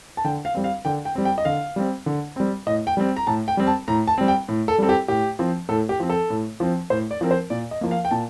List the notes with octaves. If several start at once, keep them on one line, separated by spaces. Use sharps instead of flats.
A5
D3 G5
F5
G3 C4
F5
D3 G5
G5
G3 C4
G5
D#5
D3 F5
G3 C4
D3
G3 C4
A2 D#5
G5
G3 C4
A#5
A2 A5
G5
G3 C4
A5
A2 A#5
A5
G3 C4
G5
A2
A4
G3 C4 A4
G4
A2 G4
F3 C4
A2 A4
G4
F3 C4
A4
A2
F3 C4
A2 C5
D5
F3 C4 A#4
C5
A#2 D5
D#5
F3 A#3
F5
G5
A#2 A5